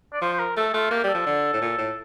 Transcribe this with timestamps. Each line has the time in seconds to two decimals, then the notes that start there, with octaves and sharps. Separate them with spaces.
0.13 D5
0.22 F3 C5
0.33 C5
0.39 A#4
0.57 A3 A4
0.74 A3 F4
0.91 A#3 G4
1.04 G3
1.09 A4
1.15 F3
1.27 D3
1.54 A2
1.62 A#2
1.78 A2